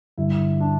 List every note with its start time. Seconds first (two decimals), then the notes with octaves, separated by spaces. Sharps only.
0.18 G1 G2 D3 E4
0.60 D4